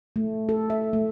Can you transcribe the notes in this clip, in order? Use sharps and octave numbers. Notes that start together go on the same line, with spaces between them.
A3
A4
E5
A3